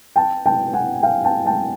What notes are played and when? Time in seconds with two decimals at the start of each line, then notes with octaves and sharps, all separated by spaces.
0.16 G5 A5
0.46 G5 A5
0.73 F#5 G#5
1.03 F5 G5
1.24 G5 A5
1.46 G5 A5